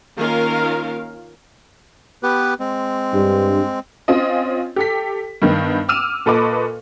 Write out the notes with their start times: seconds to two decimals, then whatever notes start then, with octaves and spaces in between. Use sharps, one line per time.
0.16 D#3 A#3 C#4 F4 A#4 F5
2.23 B3 G4 B4
2.60 G#3 C4
3.13 G2
4.08 C4 C#4 F4 D#5
4.76 G4 A4 B6
5.42 G2 D#3 B3
5.89 D6 E6 F6 D#7 E7
6.26 A#2 A4 B4 D#5 C#6 D6